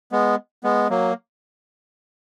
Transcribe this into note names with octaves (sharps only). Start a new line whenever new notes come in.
G#3 B3
G#3 B3
F#3 A#3